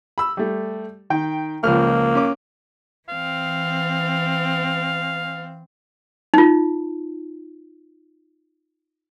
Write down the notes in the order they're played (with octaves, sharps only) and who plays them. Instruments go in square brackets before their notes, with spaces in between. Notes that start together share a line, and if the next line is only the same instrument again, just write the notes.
[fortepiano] B5 E6
G3 A3
D#3 G5
[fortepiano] C#2 F3 F6 [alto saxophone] A#3
[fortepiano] C#4 D6
[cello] E3 C4 [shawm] F5
[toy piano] D#4 F4